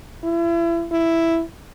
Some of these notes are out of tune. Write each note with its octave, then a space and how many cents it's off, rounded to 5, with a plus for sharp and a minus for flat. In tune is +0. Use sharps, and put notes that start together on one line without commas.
E4 +35
E4 +5